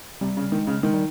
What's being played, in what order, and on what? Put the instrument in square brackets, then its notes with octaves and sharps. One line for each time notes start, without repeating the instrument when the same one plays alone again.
[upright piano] C3 [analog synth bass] G3
[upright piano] C#3
[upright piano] D#3 [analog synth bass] G#3
[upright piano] C#3
[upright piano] D#3 [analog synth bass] G#3
[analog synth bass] G3